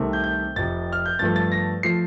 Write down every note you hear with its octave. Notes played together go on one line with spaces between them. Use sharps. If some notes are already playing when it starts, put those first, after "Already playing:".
Already playing: C2 C3 D#3 A3 C4
G6
G6
F1 F2 C3 A6
F6
G6
G2 F3 A3 A6
A6
A#6
F3 A3 C7